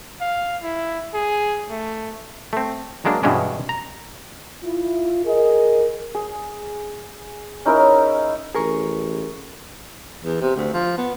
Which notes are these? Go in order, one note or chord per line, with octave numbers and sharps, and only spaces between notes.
F5
E4
G#4
A3
A3 C4
F#3 G#3 A#3 D4
G2 B2 E3 G#3 C#4 D4
A#5
E4 F4
G#4 A#4 D#5
G#4
C#4 D#4 E4 A#4
A1 G#4 A#4 C#6
E2
C3
D2
F3
B3